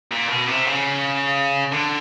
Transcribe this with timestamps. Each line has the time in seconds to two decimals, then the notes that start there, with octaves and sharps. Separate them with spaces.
0.12 A#2
0.29 B2
0.47 C3
0.66 C#3
1.72 D3